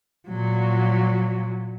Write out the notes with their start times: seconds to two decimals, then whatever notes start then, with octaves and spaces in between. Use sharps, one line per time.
0.28 A#2 F#3